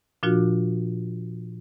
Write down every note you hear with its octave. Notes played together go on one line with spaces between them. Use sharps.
A#2 F3 D4 F4 F#4